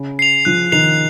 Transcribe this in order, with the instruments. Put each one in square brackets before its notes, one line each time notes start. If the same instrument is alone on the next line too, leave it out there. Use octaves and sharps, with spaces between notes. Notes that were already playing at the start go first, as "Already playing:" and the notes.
Already playing: [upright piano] C#3
[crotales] C7 F7
[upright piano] F3 [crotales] F#6
[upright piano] D#3 [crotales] C7 F7